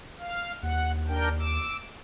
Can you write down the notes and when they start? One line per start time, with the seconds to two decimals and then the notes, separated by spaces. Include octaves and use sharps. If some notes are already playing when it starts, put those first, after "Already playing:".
0.19 F5
0.63 D#2 F#5
1.08 D4 A#4 G5
1.39 D6 E6